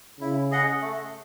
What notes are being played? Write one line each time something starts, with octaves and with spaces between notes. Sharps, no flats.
C#3 E4
G#4 D#5 F#5
A3